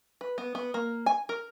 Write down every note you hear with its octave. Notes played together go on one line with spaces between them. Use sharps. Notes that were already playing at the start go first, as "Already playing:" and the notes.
B4
B3
B3
A#3
G#5
A#4